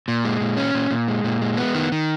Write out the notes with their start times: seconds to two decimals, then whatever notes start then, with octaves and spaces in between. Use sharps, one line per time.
0.08 A#2
0.25 G#3
0.41 A#2
0.57 C#4
0.75 A#2
0.91 A#2
1.08 G#3
1.24 A#2
1.42 G#3
1.57 B3
1.75 D#3
1.92 D#3